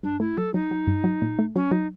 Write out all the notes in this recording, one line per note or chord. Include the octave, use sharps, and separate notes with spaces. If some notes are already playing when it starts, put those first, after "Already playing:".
G2 D4
A3 E4
F#3 A4
F#3 D#4
F#3
G2
F#3
A#2
A3
F#3 C#4
F#3 D#4